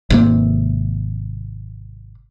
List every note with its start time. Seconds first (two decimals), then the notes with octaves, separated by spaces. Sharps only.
0.10 G#1 C3 A#3